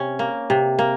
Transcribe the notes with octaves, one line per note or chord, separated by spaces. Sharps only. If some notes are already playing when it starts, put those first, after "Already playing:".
Already playing: C3 C#4
A#3
C3
A#3